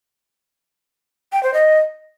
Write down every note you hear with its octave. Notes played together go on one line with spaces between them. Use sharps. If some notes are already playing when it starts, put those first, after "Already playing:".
G5
C5
D#5